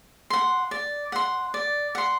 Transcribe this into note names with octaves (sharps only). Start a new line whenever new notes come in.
F#5 C6
D5
F#5 C6
D5
F#5 C6